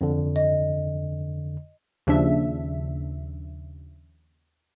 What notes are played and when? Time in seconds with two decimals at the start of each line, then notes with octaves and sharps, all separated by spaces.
0.01 F2 D3
0.36 D#5
2.07 D#2 C#3 F3 D4 E5